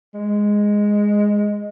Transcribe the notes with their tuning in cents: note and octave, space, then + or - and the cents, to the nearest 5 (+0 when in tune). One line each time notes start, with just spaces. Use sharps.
G#3 -5